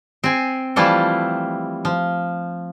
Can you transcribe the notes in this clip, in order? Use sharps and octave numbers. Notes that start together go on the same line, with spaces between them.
C4 G#5
E3 F3 G3 A3 E4 F4
F3